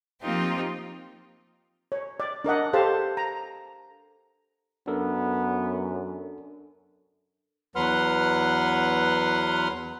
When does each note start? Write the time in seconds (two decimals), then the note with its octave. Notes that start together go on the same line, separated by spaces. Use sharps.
0.20 F3 A#3 C4 D#4 F4 G4
1.92 C#5
2.20 D5
2.44 D4 A#4 D#5 F#5
2.73 G4 A4 C5 F5 A5
3.17 A#5
4.87 F#2 B3 D4 A4 A#4
7.76 E2 F#3 B4 F#5 C6 F6